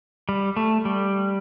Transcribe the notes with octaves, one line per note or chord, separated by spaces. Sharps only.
G3
A3
G3